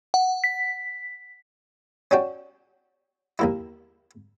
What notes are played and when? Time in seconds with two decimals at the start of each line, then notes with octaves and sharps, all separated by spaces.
0.14 F#5
0.44 B6
2.11 C#4 D4 F#4 G5
3.39 D#2 A#3 E4